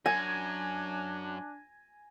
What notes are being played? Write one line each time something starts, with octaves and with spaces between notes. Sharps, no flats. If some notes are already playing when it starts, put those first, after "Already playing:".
F#2 D4 G#5 G#6 A#6